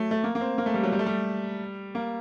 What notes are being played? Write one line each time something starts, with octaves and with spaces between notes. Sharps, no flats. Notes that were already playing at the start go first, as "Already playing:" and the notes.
Already playing: F#3 A3
A3
A#3
A#3
C4
A#3
A3
G3
F#3
G3
A3
G3
A#3